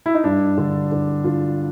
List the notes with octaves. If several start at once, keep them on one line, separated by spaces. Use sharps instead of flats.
E4
D#4
G2 D4
D3
D3
D3 F4